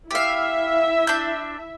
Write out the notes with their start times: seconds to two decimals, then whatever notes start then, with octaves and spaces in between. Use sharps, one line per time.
0.11 E4 G4 E5 F5
1.07 D4 G6